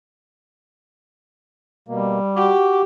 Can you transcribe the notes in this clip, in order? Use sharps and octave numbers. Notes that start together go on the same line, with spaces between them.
B2 G3 A#3
F#4 G4 D6